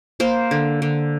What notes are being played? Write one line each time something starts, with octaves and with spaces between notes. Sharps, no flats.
A#3 C5
D3
D3